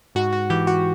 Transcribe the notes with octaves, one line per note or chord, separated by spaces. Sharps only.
G#2 F#4
F#4
E3 G4
F#4